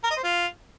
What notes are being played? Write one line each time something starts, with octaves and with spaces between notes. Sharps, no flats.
A#4
D#5
C5
F4